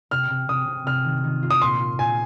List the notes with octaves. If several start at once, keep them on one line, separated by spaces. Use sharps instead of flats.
C3 F6
C3
C3 D#6
C3
C3 F6
D#3
D#3
F4
D#6
A#2 C6
F4
A#2 G#5